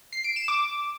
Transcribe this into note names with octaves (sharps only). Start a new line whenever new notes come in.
C7
D7
E7
D6